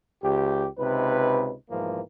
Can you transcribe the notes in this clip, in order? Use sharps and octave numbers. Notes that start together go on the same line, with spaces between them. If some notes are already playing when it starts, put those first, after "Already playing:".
C#2 G4
C#2 C3 D#4 B4
B1 G#2 E3 F3 A#3